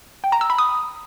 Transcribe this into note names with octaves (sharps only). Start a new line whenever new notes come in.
G5
A#5
E6
B5
D#6